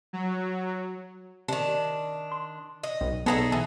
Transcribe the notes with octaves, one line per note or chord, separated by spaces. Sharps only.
F#3
C3 D#3 D4
C6
D#5
B1
B1 B3 G#4 A4 C5 D#5 A#5
E3 A5